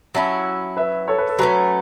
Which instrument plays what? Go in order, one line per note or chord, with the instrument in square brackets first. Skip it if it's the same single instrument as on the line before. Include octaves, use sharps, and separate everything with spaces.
[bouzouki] F#3 C#4 E4 [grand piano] E5 A5
[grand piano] B4 E5
A4 C#5
B4
A4
[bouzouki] F#3 A3 C#4 [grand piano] B4